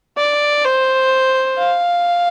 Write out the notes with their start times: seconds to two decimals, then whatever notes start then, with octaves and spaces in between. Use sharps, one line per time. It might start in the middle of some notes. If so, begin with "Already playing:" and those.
0.17 D5
0.65 C5
1.59 F5